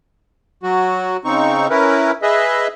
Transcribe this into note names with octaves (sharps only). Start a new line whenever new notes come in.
F#3 F#4
C#3 C4 D#4 C#6
C#4 E4 A#4 B4
G#4 B4 D#5 E5